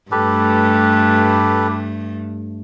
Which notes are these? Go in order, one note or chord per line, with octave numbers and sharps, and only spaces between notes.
G2 A3 G4 A4 B4